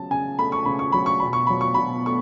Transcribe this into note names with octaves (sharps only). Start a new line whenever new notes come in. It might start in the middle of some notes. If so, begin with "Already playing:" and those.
Already playing: C#3 F#3 A5
C#3 G#5
A3 B5
C#6
C#3 B5
C#6
F#3 B5
C#6
B2 B5
C#6
F#3 B5
C#6
B2 B5
A3 C#6